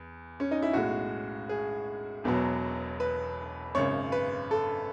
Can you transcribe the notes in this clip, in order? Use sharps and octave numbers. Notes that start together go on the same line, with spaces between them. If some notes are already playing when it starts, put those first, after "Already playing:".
Already playing: E2
C#4
D#4
E4
B1 A2 G#3 F#4
G#4
E1 E2 B2 F#3
B4
G#1 F#2 C#3 C#5
B4
A4